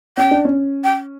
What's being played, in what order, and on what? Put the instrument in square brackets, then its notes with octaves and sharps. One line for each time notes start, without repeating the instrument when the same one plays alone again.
[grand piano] C#4 [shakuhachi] G5
[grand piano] D4
C#4
[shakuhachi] G5